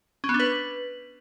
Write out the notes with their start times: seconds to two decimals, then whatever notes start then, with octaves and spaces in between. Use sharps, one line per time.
0.24 C#4
0.29 B3
0.34 D4
0.40 B4